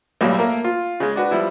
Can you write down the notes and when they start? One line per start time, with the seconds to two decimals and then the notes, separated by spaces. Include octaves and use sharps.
0.21 B1 A2 F#3 G3 A#3
0.38 A3 A#3 A#4
0.64 F4
1.00 C#3 G#3
1.16 D4 F#4 B4
1.31 F3 G3 E4